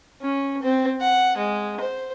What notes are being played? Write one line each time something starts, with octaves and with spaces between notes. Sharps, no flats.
C#4
C4
F#5
G#3
C5